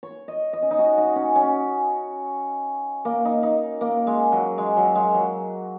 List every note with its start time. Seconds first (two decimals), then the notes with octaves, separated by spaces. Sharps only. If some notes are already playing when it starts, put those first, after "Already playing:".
0.03 C#5
0.28 D#5
0.53 D#5
0.62 C#4
0.71 D#4
0.79 F#4
0.98 D#4
1.16 C#4
1.36 C#4
3.05 A#3
3.25 D#4
3.43 D#4
3.81 A#3
4.07 G#3
4.32 F#3
4.58 G#3
4.77 F#3
4.95 G#3
5.15 F#3